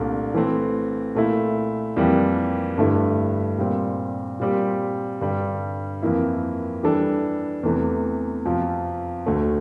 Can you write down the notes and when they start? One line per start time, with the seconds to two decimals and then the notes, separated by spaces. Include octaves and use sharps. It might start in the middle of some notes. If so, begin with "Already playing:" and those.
Already playing: C2 A#2 A3 D4
0.34 E3 A3 C4
1.15 A#2 A3 E4
1.96 F2 E3 G3 A#3
2.78 G2 D3 A3 E4
3.58 A#2 G3 C4
4.40 A#2 G3 C4 G4
5.21 G2 D3 G3
6.02 F2 E3 A#3 E4
6.83 E3 G3 D4 A4
7.63 E2 C3 E3 A3
8.45 F2 C3 F3
9.26 D2 D3 A3